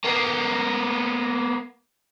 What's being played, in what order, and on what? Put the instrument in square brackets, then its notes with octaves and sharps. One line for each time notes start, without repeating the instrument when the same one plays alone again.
[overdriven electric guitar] A#3 B3